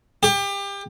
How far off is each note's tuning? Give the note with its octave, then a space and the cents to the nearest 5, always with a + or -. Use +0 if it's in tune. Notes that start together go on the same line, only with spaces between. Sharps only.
G4 +30